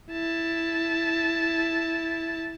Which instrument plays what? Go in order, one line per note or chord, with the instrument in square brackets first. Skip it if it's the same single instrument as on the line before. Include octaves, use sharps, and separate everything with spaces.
[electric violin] E4 A5